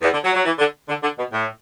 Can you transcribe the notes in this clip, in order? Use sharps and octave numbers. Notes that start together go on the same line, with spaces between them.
E2
D3
F#3
F#3
E3
D3
D3
D3
B2
A2